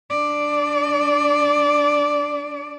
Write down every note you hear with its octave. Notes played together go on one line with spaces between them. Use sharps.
D4 D5